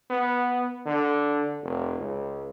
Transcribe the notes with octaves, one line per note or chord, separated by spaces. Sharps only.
B3
D3
F1
C#2